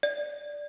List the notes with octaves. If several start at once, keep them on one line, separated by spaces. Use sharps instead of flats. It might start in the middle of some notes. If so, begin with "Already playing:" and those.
D5